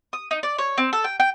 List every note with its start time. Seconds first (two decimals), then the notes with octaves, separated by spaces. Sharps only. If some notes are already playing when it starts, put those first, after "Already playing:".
0.13 D#6
0.31 D#4
0.43 D5
0.58 C#5
0.78 C4
0.93 A4
1.04 G5
1.20 G5